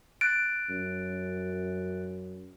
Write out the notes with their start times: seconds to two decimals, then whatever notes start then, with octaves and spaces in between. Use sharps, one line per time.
0.21 F#6 A6 D7
0.70 F#2